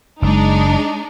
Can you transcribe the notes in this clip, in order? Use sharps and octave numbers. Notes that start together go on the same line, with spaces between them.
F#1 G#3 D4 D#4